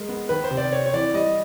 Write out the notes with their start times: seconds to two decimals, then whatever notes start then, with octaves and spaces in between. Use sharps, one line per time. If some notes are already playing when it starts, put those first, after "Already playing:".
Already playing: G#3 A#4
0.09 B3
0.29 D#3 B4
0.44 C5
0.51 C3
0.57 D5
0.72 C4 C#5
0.86 C#5
0.93 E3 D5
1.14 G3 D#5